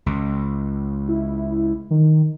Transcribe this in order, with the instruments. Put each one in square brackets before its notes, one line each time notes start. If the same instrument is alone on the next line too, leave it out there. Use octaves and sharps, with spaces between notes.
[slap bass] C#2
[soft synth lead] E4
D#3